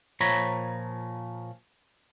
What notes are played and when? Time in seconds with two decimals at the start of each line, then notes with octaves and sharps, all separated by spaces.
0.20 A#2 F3 C#5 A#5 B5